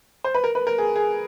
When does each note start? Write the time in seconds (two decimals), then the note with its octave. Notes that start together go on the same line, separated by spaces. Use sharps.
0.24 C5
0.35 B4
0.44 A#4
0.55 B4
0.67 A#4
0.78 G#4
0.96 G#4